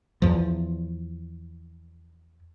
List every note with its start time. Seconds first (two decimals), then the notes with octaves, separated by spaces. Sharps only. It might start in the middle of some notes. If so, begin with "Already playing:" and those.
0.22 E2 F3